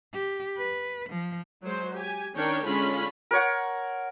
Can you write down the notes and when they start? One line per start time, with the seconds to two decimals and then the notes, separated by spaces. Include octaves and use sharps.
0.14 G4
0.58 B4
1.10 F3
1.64 F#3 G#3 C5
1.93 G4 G#5
2.37 D#3 C#4 D4 A#4 C#5 G5
2.66 D3 G#3 C#4 D4 F4 B5
3.31 A#4 C#5 F#5